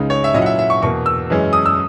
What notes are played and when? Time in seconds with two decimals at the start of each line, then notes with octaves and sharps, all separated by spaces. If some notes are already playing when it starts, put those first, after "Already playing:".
Already playing: C#2 C#3 G#3 D#4
0.10 C#5
0.24 E5
0.34 A#2 F#3 C#4 E4 D#5
0.42 F#5
0.46 E5
0.59 E5
0.70 C#6
0.82 E2 B2 A#3 C#6
1.06 E6
1.30 F#2 E3 G#3 C#4
1.53 D#6
1.66 E6